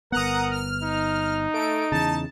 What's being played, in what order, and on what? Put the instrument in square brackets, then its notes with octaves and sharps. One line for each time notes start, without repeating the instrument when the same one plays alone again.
[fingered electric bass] G1 B3 [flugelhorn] A#4 [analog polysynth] F#5 A#5 D#6
[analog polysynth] F6
[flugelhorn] D#4
[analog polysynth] A3 D7
[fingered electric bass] E2 C#3 [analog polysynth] A5